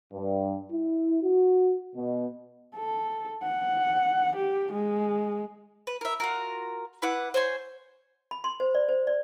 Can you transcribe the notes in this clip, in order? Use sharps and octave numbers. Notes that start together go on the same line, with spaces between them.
G2
E4
F#4
B2
A4
F#5
G4
G#3
B4
A#4 E5
F4 F#4 A#4
E4 B4 F#5 D6
C5 C#5 G#5 C6
B5
C6
C5
D5
C5
D5